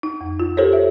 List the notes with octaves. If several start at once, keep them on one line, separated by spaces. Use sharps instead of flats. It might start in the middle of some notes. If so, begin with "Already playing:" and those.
D#4
F2
F4
F4 G4 A4 A#4 C5 C#5
E5